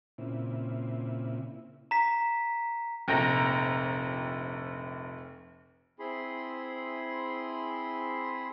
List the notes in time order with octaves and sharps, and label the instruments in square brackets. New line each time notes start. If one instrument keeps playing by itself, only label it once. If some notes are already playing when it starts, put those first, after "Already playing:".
[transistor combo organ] A#2 C#3 C4 E4
[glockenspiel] A#5 B6
[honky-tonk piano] F1 A#1 G5 A#5 A#6
[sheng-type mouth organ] C4 E4 G#4 B5 C6